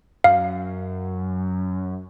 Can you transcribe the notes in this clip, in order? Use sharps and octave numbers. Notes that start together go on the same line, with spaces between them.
F#2 F5